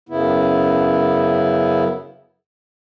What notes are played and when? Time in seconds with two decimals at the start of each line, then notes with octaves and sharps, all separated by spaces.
0.09 F#2 C#3 B3 E4